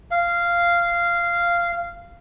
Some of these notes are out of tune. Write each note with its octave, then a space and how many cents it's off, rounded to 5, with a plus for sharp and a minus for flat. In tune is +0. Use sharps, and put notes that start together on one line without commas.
F5 -10